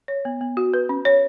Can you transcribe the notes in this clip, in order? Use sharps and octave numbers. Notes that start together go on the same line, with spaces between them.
C#5
B3
B3
F#4
B4
C#4
C#5